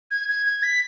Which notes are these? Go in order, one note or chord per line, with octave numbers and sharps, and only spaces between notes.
G#6
G#6
G#6
B6